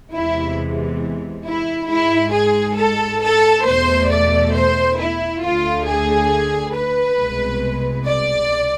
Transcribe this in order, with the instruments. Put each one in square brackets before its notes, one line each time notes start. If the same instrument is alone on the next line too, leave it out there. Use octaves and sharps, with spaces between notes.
[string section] E2 C3 E3 G#3 E4
E4
G#2 G#3 E4
G#4
A4
A4
E2 B2 A3 C5
D5
C5
E4
D2 D3 A3 F4
G#4
B4
C2 B2 G#3
D5